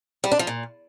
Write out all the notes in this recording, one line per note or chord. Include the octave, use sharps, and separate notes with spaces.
G3
D4
F3
A#2